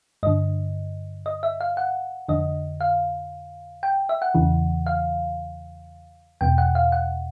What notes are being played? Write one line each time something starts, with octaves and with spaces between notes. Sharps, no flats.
G2 D3 D#5
D#5
E5
F5
F#5
F2 D3 D#5
F5
G5
E5
F#5
E2 C#3 E3
F5
E2 B2 G5
F#5
F5
F#5